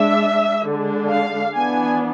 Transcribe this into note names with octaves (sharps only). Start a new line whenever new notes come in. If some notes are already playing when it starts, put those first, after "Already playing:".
Already playing: G#3 D4 E5
D3 G#3 D4
F5
E3 B3 D4 G#5